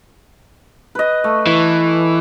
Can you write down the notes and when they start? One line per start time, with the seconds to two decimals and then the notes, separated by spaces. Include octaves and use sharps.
0.95 B4 D#5
1.24 A3
1.47 E3